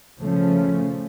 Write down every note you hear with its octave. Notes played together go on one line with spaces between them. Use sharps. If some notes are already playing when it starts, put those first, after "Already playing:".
C#3 F3 A3 C#4